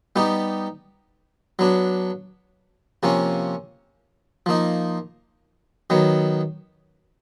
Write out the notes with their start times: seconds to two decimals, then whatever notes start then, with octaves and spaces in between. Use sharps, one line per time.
0.16 G3 B3 D#4 G4
1.59 F#3 B3 D4
3.03 C3 F3 A#3 C#4
4.46 F3 A#3 D#4
5.90 D#3 F#3 B3